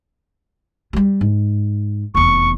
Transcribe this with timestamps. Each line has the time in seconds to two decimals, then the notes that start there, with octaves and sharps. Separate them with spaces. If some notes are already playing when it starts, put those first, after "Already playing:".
0.93 F#3 G3
1.21 G#2
2.15 F1 E2 C#6